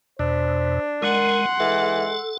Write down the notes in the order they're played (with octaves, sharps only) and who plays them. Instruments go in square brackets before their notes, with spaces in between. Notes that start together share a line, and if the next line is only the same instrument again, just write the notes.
[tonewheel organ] E2 B2 [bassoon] D4 [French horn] C5
[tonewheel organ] G#3 [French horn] A#4 [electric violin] F#5 C6
[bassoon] E3 [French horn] G#3 [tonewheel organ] A4